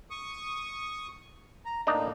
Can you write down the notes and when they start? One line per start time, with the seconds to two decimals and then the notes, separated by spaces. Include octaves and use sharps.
0.10 C#6 D#6
1.66 A#5
1.87 A2 A#3 D4 D#4 A#5